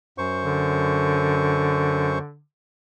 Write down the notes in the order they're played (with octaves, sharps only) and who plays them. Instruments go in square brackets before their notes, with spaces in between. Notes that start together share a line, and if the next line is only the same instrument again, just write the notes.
[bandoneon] F#2 C5 C#6
[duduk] D3